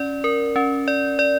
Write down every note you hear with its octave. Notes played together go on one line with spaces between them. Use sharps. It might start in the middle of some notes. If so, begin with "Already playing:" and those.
Already playing: C#4 D5
A#4
C#4
D5
D5